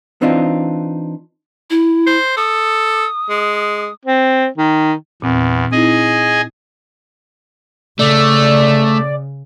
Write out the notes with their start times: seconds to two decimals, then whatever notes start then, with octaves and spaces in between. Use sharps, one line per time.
0.22 E3 C4 D4 D#4 F4
1.70 E4
2.07 C5
2.37 A4 D#6
3.30 G#3
4.05 C4
4.58 D#3
5.22 E2 A#2 C4
5.72 C4 D#4 E4 G#4 D#5 G#5
7.99 C#3 A3 D5